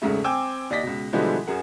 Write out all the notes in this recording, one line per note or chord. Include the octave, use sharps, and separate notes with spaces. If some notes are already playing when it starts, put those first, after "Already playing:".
E1 G#2 C#3 A3
C4 G5 G#5 D6 E6
D#2 D5 D#5 A#6 B6
C#2 B2
B2 D3 E3 F3 G3 G#3
F#2 G#4 A#4 F#5